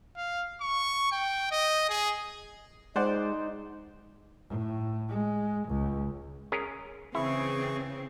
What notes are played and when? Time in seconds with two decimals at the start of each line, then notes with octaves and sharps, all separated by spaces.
0.17 F5
0.61 C#6
1.12 G5
1.51 D#5
1.89 G#4
2.96 G#3 D#4 C5 D5 F#5
4.49 A2
5.09 G#3
5.68 C#2
6.52 C#4 G#4 A#4
7.15 C#3 E3 C4 E4 G#4 C#6